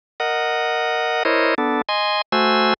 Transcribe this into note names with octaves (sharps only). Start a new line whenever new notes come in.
A#4 D#5 F#5
E4 A#4 C5 C#5 D#5
B3 D4 A4
D#5 G#5 C6
A3 F#4 C5 G#5 E6